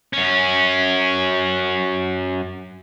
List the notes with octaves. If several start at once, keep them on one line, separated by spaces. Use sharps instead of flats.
F#2 C#4